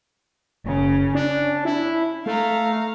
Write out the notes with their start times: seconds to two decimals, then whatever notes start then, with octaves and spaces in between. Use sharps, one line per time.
0.64 F#1 C#3 C#4
1.15 C#4 D4
1.65 E4
2.26 A3 F5 A#5